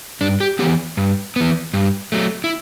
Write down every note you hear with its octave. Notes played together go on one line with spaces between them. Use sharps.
G2 D4
G4
E3 B3 G4
G2
E3 B3
G2
F#3 A3
E4